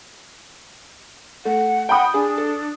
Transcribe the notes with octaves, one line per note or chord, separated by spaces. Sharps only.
A3 F#5
F#5 G5 B5 D#6
D4 G#4
A4